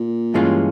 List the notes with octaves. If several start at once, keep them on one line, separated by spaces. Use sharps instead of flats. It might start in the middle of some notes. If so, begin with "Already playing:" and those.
Already playing: A#2
G2 E3 G#3 C#4 F4